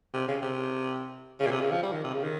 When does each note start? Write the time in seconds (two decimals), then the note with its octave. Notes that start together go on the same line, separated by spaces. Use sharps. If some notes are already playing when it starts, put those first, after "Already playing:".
0.13 C3
0.28 C#3
0.42 C3
1.40 C#3
1.46 A#2
1.51 C3
1.61 C#3
1.71 F3
1.83 G3
1.93 D#3
2.04 C3
2.14 C#3
2.24 D#3